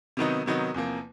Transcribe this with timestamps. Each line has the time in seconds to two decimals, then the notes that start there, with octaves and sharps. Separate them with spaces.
0.17 C3 D#3 F#3 B3 D#4
0.46 C3 D#3 F#3 B3 D#4
0.74 E2 C3 F3 A#3